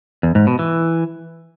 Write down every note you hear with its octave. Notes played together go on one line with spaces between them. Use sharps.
E2
G#2
B2
E3